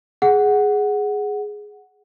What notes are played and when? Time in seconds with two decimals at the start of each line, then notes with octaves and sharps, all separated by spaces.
0.22 G#4 F#5